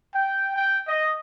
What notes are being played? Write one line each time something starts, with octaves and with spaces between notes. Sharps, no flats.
G5
G5
D#5